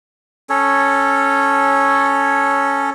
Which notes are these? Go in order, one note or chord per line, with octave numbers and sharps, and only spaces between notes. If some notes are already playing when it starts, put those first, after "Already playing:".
C#4 A4 C#5